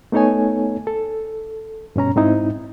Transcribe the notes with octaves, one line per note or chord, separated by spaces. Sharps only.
A3 B3 D#4 A4 C#5 G#5
A4
G2 B2 C#4 A#5
G#2 C4 D#4 E4